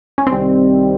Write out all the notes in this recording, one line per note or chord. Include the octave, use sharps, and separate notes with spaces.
C#4
C2 C3 D#3 G3 C4